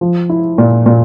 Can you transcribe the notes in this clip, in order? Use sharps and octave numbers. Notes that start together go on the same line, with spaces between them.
F3
E4
A#2
A#2